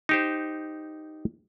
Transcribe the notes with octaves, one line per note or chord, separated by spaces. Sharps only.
D#4 G4 C5